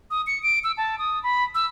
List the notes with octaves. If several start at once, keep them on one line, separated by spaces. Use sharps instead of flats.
D#6
C#7
D7
E6
A5
D#6
B5
E6